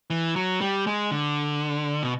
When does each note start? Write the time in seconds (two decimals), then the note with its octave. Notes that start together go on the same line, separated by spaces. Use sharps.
0.10 E3
0.36 F#3
0.61 G3
0.87 G#3
1.11 D3
2.03 B2